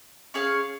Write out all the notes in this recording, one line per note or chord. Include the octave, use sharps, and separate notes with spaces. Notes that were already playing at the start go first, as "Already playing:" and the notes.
C#4 G#4 C#5 F5